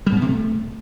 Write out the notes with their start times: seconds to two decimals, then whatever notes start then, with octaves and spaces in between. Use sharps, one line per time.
0.07 G3
0.12 G#2
0.17 B3
0.22 C3
0.27 A3